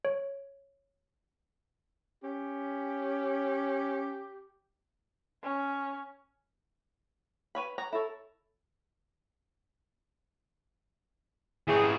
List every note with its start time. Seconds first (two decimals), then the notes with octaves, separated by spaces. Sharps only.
0.05 C#5
2.23 C#4 G4
5.43 C#4
7.55 B4 C#5 B5
7.78 C#5 F#5 A#5
7.93 E4 A4 C#5
11.68 E3 G4 G#4 C#5